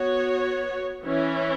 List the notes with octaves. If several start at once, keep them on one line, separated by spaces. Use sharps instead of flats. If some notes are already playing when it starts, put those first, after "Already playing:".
Already playing: B3 F#4 C#5
E3 C#4 E4